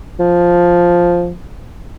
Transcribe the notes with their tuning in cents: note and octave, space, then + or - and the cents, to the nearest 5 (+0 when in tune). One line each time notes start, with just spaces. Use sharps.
F3 +0